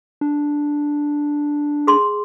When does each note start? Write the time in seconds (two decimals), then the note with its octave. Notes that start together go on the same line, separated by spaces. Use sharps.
0.21 D4
1.87 G#4 C6